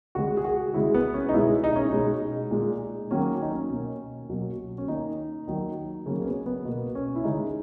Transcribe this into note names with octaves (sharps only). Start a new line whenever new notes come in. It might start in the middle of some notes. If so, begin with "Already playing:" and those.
C#3 G#3 F#4
G#4
F#4
C#3 G#3 E4
B3
C#4
D#4
B2 G#3 E4
D#4
C#4
B2 G#3 D#4
A#2 G#3
D#3 F#3 A#3 C#4
D#4
C#4
B2 A#3
B2 F#3 A#3
C#4
D#3 A#3 D#4
D#3 F#3 A#3 D#4
C#3 F#3 A#3 C#4
C#4
B3
B3
B2 A#3
C#4
E4
C#3 G#3 D#4